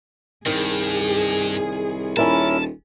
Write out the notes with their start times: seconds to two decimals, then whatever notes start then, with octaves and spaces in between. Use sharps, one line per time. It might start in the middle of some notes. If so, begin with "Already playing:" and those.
0.46 C2 G2 D#3 G#4
2.17 D#1 C#4 E4 A#4 A5